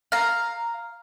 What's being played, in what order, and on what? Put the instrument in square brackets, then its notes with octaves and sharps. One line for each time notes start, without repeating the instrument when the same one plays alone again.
[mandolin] F5 A#5